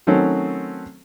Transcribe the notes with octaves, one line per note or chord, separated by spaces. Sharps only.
D#3 F#3 A3 C4 C#4